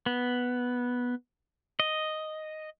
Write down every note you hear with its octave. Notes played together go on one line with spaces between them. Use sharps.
B3
D#5